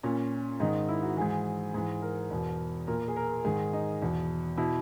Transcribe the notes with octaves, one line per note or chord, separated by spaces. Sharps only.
A#2 C#4
G#2 D#3 D#4
E4
F#4
G#2 E3 G#4
G#2 E3
A#4
E2 B2
A#2 A#4
G#4
A#4
G#2 D#3 G#4
D#4
E2 B2
B2 E4